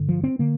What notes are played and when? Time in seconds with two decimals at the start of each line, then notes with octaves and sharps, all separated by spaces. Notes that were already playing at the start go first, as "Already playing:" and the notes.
Already playing: G2 D3
0.09 F3
0.24 C4
0.39 D3 A#3